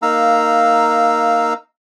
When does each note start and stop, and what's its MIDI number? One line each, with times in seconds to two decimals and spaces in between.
0.02 1.54 58
0.02 1.54 63
0.02 1.54 77
0.02 1.54 82
0.02 1.54 88